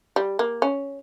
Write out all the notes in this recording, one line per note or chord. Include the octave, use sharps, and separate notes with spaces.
G3
A#3
C#4